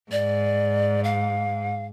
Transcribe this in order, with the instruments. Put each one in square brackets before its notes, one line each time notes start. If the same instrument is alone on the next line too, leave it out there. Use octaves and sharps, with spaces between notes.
[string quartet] G#2 [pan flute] D5
[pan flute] F5